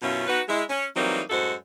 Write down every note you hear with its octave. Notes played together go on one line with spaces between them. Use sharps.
F#2 B2 C#4 E4 F4
B3 D#4 F#4 B4
G#3 E4
C#4
E3 F#3 G3 A#3 C4 D#4
F#2 A2 G#3 F#4 A4 C5